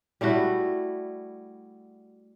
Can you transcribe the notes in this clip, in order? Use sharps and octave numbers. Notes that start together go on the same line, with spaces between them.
G3 A3 E4 F#4